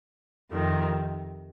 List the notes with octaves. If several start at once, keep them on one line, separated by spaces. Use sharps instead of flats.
F2 C3 D#3